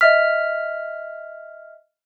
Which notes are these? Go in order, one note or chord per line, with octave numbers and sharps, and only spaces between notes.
D#5 E5 F6 B6